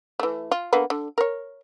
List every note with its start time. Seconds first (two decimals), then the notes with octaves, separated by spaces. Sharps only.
0.20 E3 A3
0.51 F4
0.73 D3 A#3 B3
0.90 D3
1.18 A#4 C#5